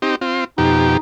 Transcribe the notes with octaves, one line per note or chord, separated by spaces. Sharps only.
C4 D#4 G4
C4 F4
F2 B2 D#4 G4